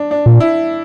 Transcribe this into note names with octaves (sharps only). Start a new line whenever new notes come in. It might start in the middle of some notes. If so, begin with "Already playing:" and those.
Already playing: D4
D4
A#2
E4